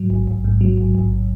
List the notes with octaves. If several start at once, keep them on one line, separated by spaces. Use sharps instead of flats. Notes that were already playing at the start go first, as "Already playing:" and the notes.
Already playing: G#2 F#3
A1
A1
G#2
F#3
A1
A1